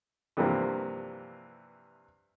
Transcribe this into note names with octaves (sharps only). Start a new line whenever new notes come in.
G2 C3 E3 F3 A#3